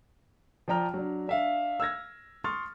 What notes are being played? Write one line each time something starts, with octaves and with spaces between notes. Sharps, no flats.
F3 D5 G5 A#5 F6
F#3 D4
D4 E5 F5
E6 F6 G#6 A#6
C6 C#6 D#6 F6 A6